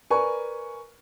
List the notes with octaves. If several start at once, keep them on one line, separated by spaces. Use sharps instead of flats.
A#4 B4 D5 G#5 C#6